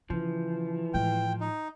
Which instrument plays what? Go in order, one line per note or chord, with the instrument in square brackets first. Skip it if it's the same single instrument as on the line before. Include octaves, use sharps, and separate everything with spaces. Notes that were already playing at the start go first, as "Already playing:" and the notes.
[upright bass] C#3 [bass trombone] E3 [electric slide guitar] F3
[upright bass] A2 G#3 [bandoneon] G5
[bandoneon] D#4